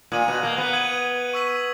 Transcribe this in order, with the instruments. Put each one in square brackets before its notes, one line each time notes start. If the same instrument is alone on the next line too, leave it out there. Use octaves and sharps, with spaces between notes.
[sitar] A#2 [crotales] D#6 G#6 D#7 F#7
[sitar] B2
A#3
B3
[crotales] D#6 G#6 D#7 F#7
C#6 E6 B6 F#7